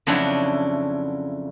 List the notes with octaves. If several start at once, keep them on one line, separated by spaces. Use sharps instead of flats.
F2 C#3 F#3 D4 E4